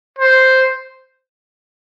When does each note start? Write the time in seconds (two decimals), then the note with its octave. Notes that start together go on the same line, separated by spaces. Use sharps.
0.19 C5